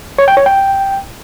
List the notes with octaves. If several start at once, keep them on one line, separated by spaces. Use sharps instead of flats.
C#5
G5
C#5
G5